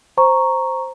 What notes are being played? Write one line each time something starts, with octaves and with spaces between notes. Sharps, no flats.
C5 A#5 C#6